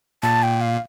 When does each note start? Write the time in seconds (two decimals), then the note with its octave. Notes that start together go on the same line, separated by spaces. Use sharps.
0.23 A#2 A5
0.43 G5
0.61 F5